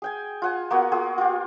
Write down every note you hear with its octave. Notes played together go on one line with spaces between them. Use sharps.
G#4 G5 G#5
F4 F#5 G#5
A#3 B3 F#4
F4 F#4 G#4
F4 G4